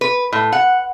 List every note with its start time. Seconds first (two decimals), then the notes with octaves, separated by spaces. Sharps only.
0.01 B4
0.33 A2
0.52 F#5